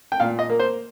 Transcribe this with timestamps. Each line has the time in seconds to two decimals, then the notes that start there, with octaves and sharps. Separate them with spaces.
0.12 G5
0.20 A#2 F5
0.39 D#5
0.50 A#3
0.59 C5